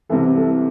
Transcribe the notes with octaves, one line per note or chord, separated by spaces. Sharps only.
C2 C3 E3 A4
A4